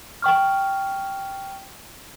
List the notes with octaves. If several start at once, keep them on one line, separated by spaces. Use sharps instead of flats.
G5 C#6 F6